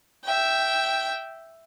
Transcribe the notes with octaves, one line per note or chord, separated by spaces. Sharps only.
E5 G5